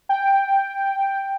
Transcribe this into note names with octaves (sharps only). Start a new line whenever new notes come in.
G5